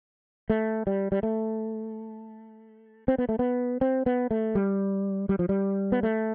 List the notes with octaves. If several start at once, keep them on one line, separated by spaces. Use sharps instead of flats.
A3
G3
G3
A3
C4
B3
A3
B3
C4
B3
A3
G3
G3
F3
G3
B3
A3